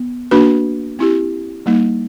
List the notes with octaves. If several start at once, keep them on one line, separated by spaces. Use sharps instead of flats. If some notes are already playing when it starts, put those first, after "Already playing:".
Already playing: B3
A#3 D4 F#4 B4
C4 E4 G4
G3 A#3 D#4